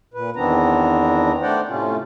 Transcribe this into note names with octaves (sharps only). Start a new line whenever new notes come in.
A#2 B4
E2 D#3 B3 C4 D4 A#5
A3 D4 C5 D5 F#5 G5
A2 C3 A3 C#4 F4